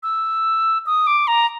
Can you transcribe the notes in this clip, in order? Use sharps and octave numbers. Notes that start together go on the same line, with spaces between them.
E6
D#6
D6
A#5